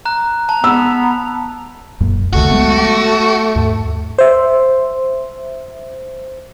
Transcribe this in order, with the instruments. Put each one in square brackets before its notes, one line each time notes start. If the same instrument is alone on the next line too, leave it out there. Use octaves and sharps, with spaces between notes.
[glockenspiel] A#5 F#6
[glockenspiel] A5 [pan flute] A#5
[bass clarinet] B3 [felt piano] E6
[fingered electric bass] E1 F#2 A#2
[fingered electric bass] F1 C#2 D#3 [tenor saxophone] A3 [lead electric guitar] F#4
[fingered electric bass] F#3 G#3 B3
D#2 G#2
[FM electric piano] C5 E5